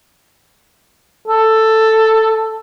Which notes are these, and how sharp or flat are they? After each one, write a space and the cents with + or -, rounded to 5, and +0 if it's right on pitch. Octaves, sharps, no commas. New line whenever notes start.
A4 +5